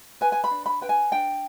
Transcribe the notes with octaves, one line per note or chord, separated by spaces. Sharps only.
B4 G#5
G#5
B5
D4
B5
B4 G5
G#5
D4 G5